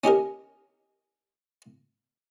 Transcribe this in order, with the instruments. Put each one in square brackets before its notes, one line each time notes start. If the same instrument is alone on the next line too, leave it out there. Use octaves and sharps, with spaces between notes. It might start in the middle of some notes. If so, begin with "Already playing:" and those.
[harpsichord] C#4 D#4 G4 A#4